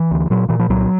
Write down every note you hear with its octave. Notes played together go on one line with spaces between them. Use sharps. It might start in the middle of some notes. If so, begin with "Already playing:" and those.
Already playing: E3
D2
A#2 F#3
A#2 E3
F3
C2 F#3